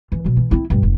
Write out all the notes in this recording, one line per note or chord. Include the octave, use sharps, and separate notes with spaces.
E3
B2 F#3
E3
C4 E4
A#1 G2
F1